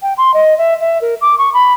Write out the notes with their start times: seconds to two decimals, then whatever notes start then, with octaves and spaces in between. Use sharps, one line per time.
0.02 G5
0.17 C6
0.33 D#5
0.57 E5
0.80 E5
1.01 A#4
1.21 D6
1.38 C#6
1.53 B5